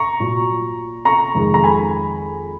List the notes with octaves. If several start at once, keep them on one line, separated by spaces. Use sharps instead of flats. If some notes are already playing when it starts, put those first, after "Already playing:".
Already playing: A#5 C#6
A#2 F#3
A#5 C#6
F2 D#3 G#3
A#5
G#5 B5